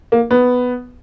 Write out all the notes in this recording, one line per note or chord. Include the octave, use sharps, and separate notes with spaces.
A#3
B3